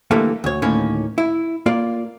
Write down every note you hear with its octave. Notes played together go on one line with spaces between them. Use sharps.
D3 E3 G3 A3 A#3
D2 C#5
D2 A2 D#3 A#3 C#4
E4
A#3 F4 D5